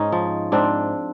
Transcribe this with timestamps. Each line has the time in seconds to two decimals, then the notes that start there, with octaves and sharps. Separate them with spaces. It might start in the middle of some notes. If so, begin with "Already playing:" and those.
Already playing: G#2 C#4 D#4
0.12 F3
0.52 G#2 C4 D4